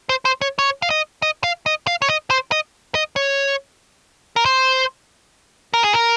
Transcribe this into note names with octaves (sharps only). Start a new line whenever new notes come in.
C5
C5
C#5
C#5
F5
D#5
D#5
F5
D#5
F5
C#5
D#5
C5
D#5
D#5
C#5
A#4
C5
A#4
G#4
A#4